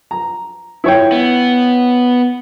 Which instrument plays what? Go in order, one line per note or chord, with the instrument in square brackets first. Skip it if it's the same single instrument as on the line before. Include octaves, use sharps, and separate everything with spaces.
[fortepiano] A#5
E4 C#5 G5
[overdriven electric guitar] B3